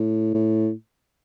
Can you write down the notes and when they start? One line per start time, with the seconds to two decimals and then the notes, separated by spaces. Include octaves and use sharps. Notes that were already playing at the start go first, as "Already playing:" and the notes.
Already playing: A2
0.34 A2